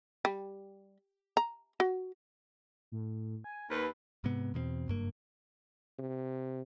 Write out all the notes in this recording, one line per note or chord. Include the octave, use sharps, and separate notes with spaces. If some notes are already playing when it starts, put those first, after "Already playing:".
G3
A#5
F#4
A2
G#5
D#2 B4 B5
G#2 C3 G#3 B3
E2 B2 A#3 C4
F#1 G2 A#3
C3